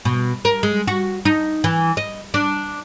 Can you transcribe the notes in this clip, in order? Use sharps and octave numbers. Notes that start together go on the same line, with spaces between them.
B2
A#4
G#3
F#4
D#4
E3
D#5
D4